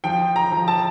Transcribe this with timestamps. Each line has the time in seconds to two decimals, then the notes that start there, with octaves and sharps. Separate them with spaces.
0.04 F3 G5
0.36 A#5
0.52 F3
0.68 A5